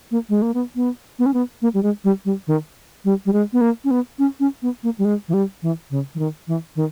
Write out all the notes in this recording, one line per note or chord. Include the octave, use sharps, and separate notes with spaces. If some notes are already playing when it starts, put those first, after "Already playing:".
A#3
G#3
A#3
B3
B3
B3
C#4
B3
A#3
G3
G#3
G3
G3
D#3
G3
G3
G#3
B3
A#3
C#4
B3
C#4
C#4
B3
A#3
G3
G#3
E3
G3
E3
C#3
E3
D#3
E3
D#3